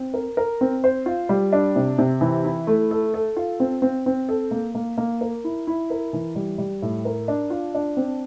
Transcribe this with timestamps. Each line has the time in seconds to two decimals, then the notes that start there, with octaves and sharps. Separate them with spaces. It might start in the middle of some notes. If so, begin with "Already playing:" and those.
Already playing: C4
0.14 A#4
0.37 A#4
0.61 C4
0.84 C5
1.06 F4
1.29 G3
1.52 D4
1.76 C3
1.98 C3
2.21 E3
2.45 E4
2.67 A3
2.91 A4
3.14 A4
3.36 F4
3.60 C4
3.82 C4
4.06 C4
4.29 A4
4.51 A#3
4.75 A#3
4.98 A#3
5.21 A#4
5.44 E4
5.67 E4
5.90 A#4
6.13 E3
6.36 G3
6.58 G3
6.82 A2
7.05 A#4
7.28 D4
7.50 F4
7.74 D4
7.97 C4